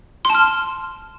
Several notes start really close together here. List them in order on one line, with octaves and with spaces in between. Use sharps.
C6 A5 F6